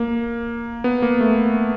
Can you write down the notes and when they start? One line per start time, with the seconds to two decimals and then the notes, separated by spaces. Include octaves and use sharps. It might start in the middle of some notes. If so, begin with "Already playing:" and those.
Already playing: A#3
0.84 B3
1.02 A#3
1.21 A3